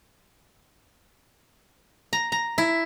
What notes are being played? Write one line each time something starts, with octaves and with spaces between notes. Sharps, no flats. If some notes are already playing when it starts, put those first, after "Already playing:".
A#5
A#5
E4